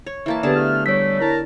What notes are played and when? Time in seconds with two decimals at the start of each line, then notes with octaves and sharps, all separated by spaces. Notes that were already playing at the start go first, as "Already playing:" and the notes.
0.06 C#5
0.26 E3 A#3 A5
0.43 D3 B3 G4 G#4 B4 A5
0.56 A3 F6
0.86 G3 A3 C#5 B6
1.20 E4 A#4 A5 A#5